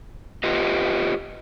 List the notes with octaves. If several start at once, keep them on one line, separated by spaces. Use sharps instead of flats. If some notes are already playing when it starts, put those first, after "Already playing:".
F4 G4 B4 D#5